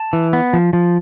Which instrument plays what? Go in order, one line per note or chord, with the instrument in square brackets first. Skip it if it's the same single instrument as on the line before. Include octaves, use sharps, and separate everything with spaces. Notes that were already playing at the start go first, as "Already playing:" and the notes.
Already playing: [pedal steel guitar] A5
E3
B3
F3
F3